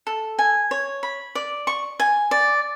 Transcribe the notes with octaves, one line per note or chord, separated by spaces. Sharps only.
A4
G#5
C#5
B5
D5
C#6
G#5
D5